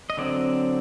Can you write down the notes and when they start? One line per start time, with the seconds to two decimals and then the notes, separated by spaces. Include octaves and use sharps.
0.10 D#5
0.17 D3 F#3 C4 D5